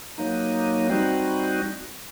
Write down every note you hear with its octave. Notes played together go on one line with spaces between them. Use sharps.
F#3 A#3 D#4
G3 C4 D#4 F#4